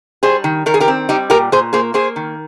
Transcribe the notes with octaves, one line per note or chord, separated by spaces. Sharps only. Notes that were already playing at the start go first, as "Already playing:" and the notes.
G3 G#4 C5
D#3
D#3 A#4
G#4
G4 A#4
C4
G3 D#4 G4
A#2 G4 A#4
A#2 G#4 C5
A#3 G#4 C5
A#3 G#4 C5
D#3